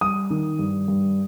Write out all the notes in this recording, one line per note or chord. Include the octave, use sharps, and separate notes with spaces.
G3 D#6
D#3
G2
G2